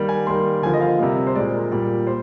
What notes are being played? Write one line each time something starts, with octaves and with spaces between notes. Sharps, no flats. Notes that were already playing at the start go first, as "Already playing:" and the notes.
Already playing: D#3 G3 A#3
G#5
D#3 G3 A#3 C6
D3 F3 A#3 G#5
D#5
F5
C3 G3 A#3 D#5
C5
A#2 G#3 D5
A#4
A#2 G3 A#3
C5